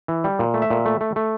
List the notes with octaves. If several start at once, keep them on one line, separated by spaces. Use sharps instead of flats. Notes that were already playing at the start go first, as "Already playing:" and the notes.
E3
G3
A#2
A3
E5
A#2
A3
A3
A3